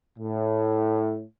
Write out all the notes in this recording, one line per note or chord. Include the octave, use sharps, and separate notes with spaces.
A2